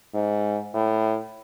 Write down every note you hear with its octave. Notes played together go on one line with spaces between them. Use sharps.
G#2
A2